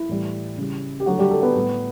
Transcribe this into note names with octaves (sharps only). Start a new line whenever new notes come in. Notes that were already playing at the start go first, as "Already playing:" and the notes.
Already playing: E4
A2 E3 G3
C#3 G3
G4
D3 F#3 A3 F#4
G3 G4
A3 A4
B3 B4
A2 G3